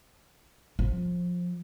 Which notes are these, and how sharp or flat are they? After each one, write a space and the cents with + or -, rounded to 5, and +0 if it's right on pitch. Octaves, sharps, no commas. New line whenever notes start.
F3 +20